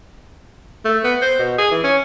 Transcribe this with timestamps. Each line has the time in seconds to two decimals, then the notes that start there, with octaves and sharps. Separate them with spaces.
0.85 A3
1.04 B3
1.21 C5
1.39 B2
1.58 G#4
1.71 E3
1.83 C#4